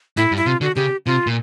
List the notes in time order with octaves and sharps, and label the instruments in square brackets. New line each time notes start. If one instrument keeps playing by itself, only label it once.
[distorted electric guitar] A2 [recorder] E4
[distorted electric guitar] G2
[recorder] E4
[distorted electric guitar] C3 [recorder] F4
[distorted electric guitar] D3 [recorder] F#4
[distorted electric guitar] C#3 [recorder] G4
[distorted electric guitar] C3 [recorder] F4
[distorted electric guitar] A#2